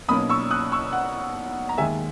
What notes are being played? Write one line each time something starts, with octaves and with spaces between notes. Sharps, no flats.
B1 B2 A#3 C#4 B5 D#6
C#6 E6
D#6 F#6
C#6 E6
F#5
A#5
D#2 D#3 G#3 E5 G#5